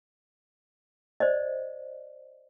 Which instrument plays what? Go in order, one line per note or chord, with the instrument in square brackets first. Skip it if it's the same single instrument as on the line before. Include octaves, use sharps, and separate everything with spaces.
[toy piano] C5 D5 D#5